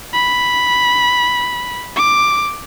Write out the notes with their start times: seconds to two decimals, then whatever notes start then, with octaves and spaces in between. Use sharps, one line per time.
0.13 B5
1.96 D6